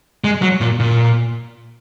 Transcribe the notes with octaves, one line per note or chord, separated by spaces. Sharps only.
G#3
F#3
A#2
A#2